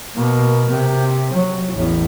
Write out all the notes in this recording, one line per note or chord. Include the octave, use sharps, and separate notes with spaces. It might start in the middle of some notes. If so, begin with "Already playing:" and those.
B2 A#3
C3
F#3
A1 E2